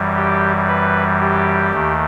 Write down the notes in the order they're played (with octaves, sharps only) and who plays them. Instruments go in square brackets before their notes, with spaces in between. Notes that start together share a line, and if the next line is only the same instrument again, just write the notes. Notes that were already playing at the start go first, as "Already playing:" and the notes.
Already playing: [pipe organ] F#2 E3 G3
G4
B4
G4
D#2 D#3 A3